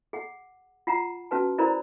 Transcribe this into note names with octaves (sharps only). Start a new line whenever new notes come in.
G#4 F#5
F4 F#5 A#5
C#4 F#4 B4 A5
E4 A#4 C5 D5 A#5 B5